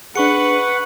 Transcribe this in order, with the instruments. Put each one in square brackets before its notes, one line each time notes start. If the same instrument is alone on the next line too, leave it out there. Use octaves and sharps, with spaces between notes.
[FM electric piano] D4 G#4 [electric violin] B4 [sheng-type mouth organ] F#5 [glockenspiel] C#6 C#7